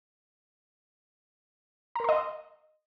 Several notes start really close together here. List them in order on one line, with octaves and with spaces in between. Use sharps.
A#5 A#4 C6 D#5